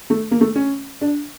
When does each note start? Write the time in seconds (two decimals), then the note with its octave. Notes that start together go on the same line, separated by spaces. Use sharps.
0.10 A3
0.31 A#3
0.41 A3
0.56 C#4
1.01 D4